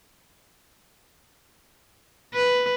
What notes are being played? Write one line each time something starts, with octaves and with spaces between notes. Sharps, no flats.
B4